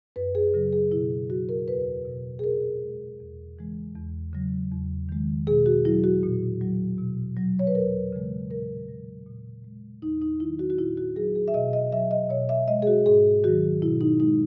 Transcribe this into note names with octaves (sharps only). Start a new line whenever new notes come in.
F#2 B4
G#4
C#3 F#3
G#4
B2 E4
F#3 F#4
A#4
E2 B4
B2 F#3
G#4
A#2 A#4
G#3
E2
C#3 E3 G#3
E2
C#3 F#3
E2
D#3 G#3
B2 G#4
F#4
F#3 E4
F#4
A#2
F#3
B2
F#3
C#5
B4
E2 A#4
C#3 E3 G#3
A#2 A#4
F#3
A#2
G#3
E2 D#4
D#4
D#3 F#3 E4
F#4
F#4
A#2 E4
F#4
F#3 G#4
G#4
E5
B2 D#5
D#5
F#3 E5
D#5
B2 C#5
E5
G#3 D#5
G#4
F#4
G#2 G#4
D#3 F#3 F#4
B2 E4
D#4
G#3 D#4